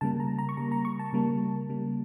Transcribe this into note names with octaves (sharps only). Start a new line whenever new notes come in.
C#3 G3 A#3 A5
A#5
A#5
C#6
C#3 G3 A#3 A#5
A#5
C#6
A5
C#3 G3 A#3
C#3 G3 A#3